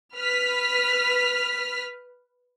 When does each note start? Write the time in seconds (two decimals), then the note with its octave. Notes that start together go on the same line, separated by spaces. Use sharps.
0.15 B4 F6 B6